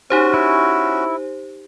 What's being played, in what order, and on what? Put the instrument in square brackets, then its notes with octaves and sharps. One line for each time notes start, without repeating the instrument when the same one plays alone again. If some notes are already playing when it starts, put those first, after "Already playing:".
[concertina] C#4 F#4 [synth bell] D#4 G4 C5
[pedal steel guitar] E4